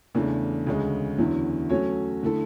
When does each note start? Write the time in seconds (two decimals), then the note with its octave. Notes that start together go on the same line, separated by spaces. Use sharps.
0.15 E2 C#3 E3 A3 D4
0.67 D2 C#3 G#3
1.18 E2 D3 F#3 C#4 E4
1.70 F#3 A3 C#4 F#4 C#5
2.23 D3 A3 E4 A4